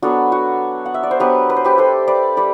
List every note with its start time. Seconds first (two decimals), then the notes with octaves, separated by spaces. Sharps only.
0.02 F#3 B3 D4 F#4 A4
0.32 F#4
0.86 F#5
0.94 E5
1.03 D5
1.11 C5
1.20 F#3 B3 D4 G4 B4
1.50 B4
1.56 C5
1.65 G4 B4
1.78 A4 C5
2.08 B4 D5
2.37 G3 B4 D5